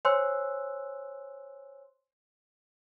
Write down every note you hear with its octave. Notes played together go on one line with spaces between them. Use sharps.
C5 C#5 G#5 C6 E6 F#6